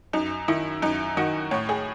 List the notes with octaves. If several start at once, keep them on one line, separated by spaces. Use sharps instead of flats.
F#2 D#4
D#3 E4
F#2 D#4
D#3 F#4
A2 C#5
G#4